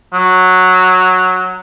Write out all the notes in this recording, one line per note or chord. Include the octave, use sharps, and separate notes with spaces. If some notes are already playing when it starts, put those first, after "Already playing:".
F#3